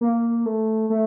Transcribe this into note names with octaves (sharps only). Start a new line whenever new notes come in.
A#3
A3
A3